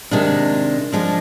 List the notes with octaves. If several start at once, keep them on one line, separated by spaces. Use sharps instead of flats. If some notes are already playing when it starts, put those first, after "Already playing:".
C3 D#3 G#3 D4
F3 G#3 D4